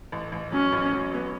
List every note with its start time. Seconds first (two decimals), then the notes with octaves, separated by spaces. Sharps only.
0.12 A1
0.32 A1
0.52 F#3 C#4
0.73 A1
0.92 F#3
1.14 B3